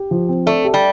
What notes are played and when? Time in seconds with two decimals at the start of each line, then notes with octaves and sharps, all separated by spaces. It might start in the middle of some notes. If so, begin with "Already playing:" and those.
Already playing: G4
0.11 F3
0.29 C4
0.46 A3 D5
0.65 G4
0.74 G3